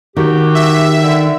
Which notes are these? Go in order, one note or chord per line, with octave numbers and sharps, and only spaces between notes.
D#3 F#4 G4
E5
D3